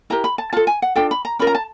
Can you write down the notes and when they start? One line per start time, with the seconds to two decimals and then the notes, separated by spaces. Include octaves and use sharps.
0.10 E4 G4 A#4 A#5
0.24 B5
0.38 A5
0.53 F4 A4 A5
0.67 G#5
0.82 F#5
0.96 D4 F4 A4 G5
1.11 B5
1.25 A#5
1.39 C#4 F4 A#4 B5
1.47 A#5
1.55 A5